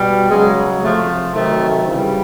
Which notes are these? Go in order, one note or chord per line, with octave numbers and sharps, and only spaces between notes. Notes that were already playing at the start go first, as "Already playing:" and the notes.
Already playing: B2 G3
C#3 F#3 G#3
C3 F3 A3
C3 D#3 F#3 A3
C#3 E3 G3